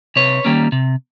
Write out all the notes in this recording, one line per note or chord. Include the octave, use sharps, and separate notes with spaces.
C3 B4 C#5
D#3 G3 A#3 C#4
C3